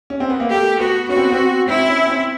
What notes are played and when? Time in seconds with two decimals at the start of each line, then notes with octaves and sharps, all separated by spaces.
0.10 C#4
0.20 C4
0.30 B3
0.40 A#3
0.50 A3 G4
0.79 B3 F#4
1.09 C#4 F#4
1.17 C4
1.24 B3
1.32 C4
1.68 C4 E4
1.88 C#4
2.07 C4